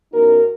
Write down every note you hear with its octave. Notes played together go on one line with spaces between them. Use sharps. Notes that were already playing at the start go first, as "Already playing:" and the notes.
F#2 E3 B3 D#4 F#4 A#4